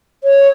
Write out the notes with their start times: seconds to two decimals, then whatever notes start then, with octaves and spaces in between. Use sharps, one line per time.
0.24 C#5